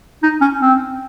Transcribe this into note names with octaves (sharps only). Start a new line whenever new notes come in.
D#4
C#4
C4